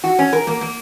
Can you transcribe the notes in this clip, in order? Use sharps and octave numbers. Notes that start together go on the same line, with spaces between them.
F#4
C#4
A#4
A#3
A#3